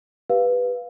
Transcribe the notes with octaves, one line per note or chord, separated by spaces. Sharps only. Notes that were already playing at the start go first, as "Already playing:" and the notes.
G4 B4 F5